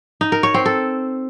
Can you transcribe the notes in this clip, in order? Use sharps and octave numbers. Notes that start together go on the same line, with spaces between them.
D#4
A#4
C#5
C4
A4